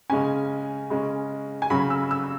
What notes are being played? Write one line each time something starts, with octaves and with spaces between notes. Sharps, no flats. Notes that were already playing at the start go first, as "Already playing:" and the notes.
C#3 G#3 C#4 G#5
C#3 G#3 C#4
G#5
C#3 F#3 C#4 B5
E6
E6